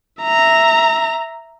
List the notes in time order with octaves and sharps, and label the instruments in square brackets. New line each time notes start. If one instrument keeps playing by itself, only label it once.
[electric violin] E5 A#5